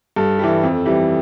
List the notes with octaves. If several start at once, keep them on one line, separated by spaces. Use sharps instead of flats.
G2 A4
E3 G3
F2
E3 G3